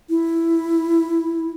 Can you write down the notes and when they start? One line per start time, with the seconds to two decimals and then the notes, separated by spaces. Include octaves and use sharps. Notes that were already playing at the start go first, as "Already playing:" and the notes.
0.10 E4